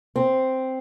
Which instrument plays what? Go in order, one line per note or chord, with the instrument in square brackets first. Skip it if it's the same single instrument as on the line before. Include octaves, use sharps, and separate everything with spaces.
[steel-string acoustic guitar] C4